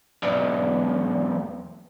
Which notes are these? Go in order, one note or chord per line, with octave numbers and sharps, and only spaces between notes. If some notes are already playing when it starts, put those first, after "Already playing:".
B1 E2